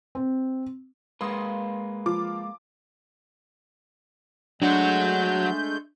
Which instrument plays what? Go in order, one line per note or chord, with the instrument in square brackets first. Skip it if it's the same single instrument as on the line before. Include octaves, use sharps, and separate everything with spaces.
[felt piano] C4
[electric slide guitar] G#3 A#3 B4 [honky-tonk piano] C6 D#6
[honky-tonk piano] F3 F4 D6
[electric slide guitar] F#3 F#4 [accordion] G#3 A3 G6 [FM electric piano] D4